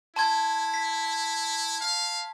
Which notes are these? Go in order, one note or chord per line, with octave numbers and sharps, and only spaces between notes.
E4 A5 C6 G#6
B6
F5